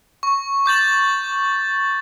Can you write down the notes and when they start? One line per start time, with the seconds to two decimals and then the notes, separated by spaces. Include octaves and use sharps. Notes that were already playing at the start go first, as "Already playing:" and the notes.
0.23 C#6
0.66 D6 G6 A6 F#7